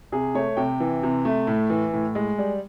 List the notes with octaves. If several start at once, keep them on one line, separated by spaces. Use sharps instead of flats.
C3 G#4
A3 C#5
C3 G5
E3
C3
A3
A2
E3
A2
G#3
G3